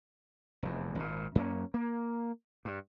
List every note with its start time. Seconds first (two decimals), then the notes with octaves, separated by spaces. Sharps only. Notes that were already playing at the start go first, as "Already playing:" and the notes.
0.63 F1 E2
0.95 G#1 A#2
1.35 F#2 A#3 C4 C#4
1.74 A#3
2.65 G2